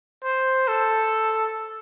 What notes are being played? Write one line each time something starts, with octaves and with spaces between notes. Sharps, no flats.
C5
A4